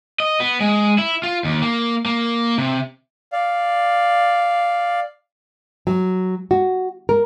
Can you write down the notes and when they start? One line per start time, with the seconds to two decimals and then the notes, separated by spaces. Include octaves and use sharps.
0.20 D#5
0.40 B3
0.60 G#3
0.98 E4
1.23 F4
1.44 D#2
1.62 A#3
2.06 A#3
2.58 C3
3.32 D5 F5
5.87 F#3
6.51 F#4
7.09 A#4